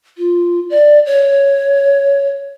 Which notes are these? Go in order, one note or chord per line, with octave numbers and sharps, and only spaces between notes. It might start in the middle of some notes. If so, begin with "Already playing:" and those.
F4
D5
C#5